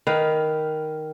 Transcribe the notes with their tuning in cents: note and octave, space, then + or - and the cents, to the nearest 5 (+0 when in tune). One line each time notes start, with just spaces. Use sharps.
D#3 +0 B4 +0 F5 +0